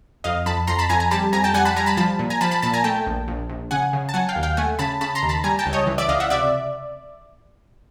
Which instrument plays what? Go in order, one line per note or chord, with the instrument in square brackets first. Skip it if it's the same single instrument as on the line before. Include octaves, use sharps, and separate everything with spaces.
[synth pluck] F2 D#5 F5
F2 A5 B5
F2 A#5 C6
A5 B5
F2 G#5 A#5
G#5 A#5
G3 A5 B5
F2 G#5 A#5
G5 A5
G3 F#5 G#5
A5 B5
G3 G#5 A#5
A5 B5
F3 A5 B5
A#2
G#5 A#5
F3 A5 B5
A5 B5
A#2 A5 B5
G#5 A#5
A3 G5 A5
A#1
A#1
A#1
C#3 F#5 G#5
C#3
A5
F#3 F#5 G#5
F5 G5
D#2
F5 G5
A3 F#5 G#5
C#3 A5 B5
C#3 A5 B5
A#5 C6
D#2
A5 B5
G3 G#5 A#5
G5 A5
C#2
C#5 D#5
E3
D5 E5
C#2 D#5 F5
E5 F#5
C3 D5 E5